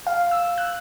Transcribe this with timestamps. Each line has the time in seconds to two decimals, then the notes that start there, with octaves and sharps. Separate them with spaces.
0.07 F5
0.31 E6
0.58 F#6